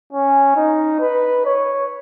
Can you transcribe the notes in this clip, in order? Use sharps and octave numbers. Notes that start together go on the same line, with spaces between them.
C#4
D#4
B4
C#5